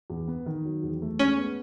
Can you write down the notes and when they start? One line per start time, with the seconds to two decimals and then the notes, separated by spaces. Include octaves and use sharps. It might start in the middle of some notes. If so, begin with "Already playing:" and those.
0.10 E2
0.28 B3
0.46 D#3
0.65 F#3
0.83 E2
1.02 A3
1.19 G#3 C#4
1.38 B3